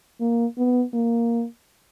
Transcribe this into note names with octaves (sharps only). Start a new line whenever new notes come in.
A#3
B3
A#3